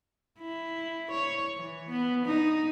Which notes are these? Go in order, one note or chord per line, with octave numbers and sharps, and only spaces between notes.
E4
C#5
E3
B3
D#4